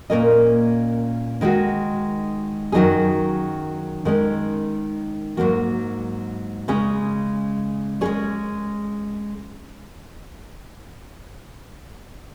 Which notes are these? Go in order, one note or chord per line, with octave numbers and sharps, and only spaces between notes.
A#2 A#3 C#4 A#4 D#5
D#3 G#3 D#4 F#4
F#2 D#3 F#3 D#4 G#4
D#3 G#3 C#4
G#2 F#3 A#3 F#4
C#3 G#3 C#4 G#4
G#3 C#4 G#4 C#5